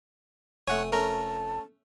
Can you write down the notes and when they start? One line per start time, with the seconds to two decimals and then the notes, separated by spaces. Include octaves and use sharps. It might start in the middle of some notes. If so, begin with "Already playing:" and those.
0.67 F1 A3 C#5 F#5 G#5
0.92 A3 C#4 A#4 A5 A#5